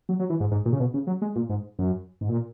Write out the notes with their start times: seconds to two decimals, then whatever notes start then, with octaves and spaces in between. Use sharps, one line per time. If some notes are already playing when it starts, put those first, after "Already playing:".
0.09 F#3
0.19 F#3
0.30 E3
0.40 G#2
0.51 G#2
0.65 A#2
0.72 C#3
0.80 B2
0.94 C#3
1.07 F#3
1.22 G#3
1.36 A#2
1.49 G#2
1.79 F#2
2.21 G#2
2.29 A#2